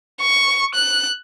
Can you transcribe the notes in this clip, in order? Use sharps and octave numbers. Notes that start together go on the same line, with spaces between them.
C#6
F#6